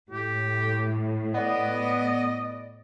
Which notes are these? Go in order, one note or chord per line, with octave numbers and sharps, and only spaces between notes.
A2 G4
B3 D5 D#5